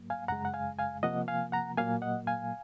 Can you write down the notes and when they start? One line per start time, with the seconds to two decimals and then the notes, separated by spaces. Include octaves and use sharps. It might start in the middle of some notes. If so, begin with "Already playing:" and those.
Already playing: G#2 F#3 A#3
0.10 F5 G#5
0.28 F#2 C#3 G#3 F#5 A#5
0.45 F#5
0.54 F5 G#5
0.79 F5 G#5
1.03 C3 F3 A#3 D#5 F#5
1.28 F5 G#5
1.52 F#5 A#5
1.77 A#2 F#3 A#3 F5 G#5
2.02 D#5 F#5
2.27 F5 G#5